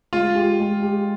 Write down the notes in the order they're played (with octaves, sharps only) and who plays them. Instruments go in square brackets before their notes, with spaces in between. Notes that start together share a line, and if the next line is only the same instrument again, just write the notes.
[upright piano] G#3 [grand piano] F4
[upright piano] G4
G#3
G4